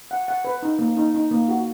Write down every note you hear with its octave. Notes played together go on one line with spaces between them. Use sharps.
F#5
F#5
B4
D#4
A#3
D#4
D#4
A#3
F#4